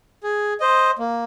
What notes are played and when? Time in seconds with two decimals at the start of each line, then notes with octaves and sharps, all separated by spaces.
0.24 G#4
0.60 C5 D#5
0.99 A#3